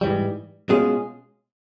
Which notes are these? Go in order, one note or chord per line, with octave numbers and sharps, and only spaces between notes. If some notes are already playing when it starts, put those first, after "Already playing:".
G#2 E3 G3
B2 G#3 C#4 F4 G#4